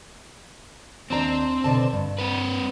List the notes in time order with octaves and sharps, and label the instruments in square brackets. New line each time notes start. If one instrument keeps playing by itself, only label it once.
[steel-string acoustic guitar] D#2 D4 A#5 [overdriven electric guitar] C4
[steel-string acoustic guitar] B2 D3 A5
G2
[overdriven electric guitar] C4 B4